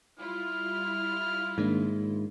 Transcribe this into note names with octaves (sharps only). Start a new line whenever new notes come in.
G3 E4 F4 F6
G#2 D#3 A#3 D4